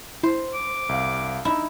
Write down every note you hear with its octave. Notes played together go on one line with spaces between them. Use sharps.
E4 C5
D6
C2 F5
D#4 E4